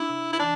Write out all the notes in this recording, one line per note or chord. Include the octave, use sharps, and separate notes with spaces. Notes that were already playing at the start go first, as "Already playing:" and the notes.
Already playing: D4 E4
C3
E4
E3 D4